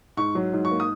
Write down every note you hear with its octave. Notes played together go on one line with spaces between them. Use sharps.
G#2 C#6
F#3
G#2
C#6
A#3
D#6